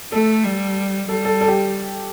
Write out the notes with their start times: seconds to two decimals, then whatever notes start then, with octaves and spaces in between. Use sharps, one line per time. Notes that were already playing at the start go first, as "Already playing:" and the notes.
0.12 A3 A4
0.44 G3
1.09 G3 A4
1.25 A4
1.41 A4
1.48 G4